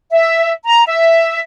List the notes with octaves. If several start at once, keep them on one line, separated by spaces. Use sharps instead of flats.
E5
A#5
E5